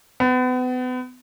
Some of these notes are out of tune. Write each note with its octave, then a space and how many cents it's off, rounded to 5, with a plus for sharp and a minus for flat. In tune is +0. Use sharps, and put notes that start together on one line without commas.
B3 +35